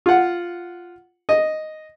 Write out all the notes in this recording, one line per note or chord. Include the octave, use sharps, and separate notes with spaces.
F4 F#5
D#5